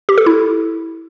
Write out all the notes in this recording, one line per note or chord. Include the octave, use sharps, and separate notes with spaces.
G4
A4
E4